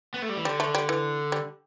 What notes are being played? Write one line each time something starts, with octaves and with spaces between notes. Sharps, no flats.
B3
A3
G3
E3
D3 G3
A3
G3
E3
G3